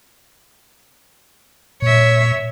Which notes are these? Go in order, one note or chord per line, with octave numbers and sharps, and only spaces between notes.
A#2 C#5 E5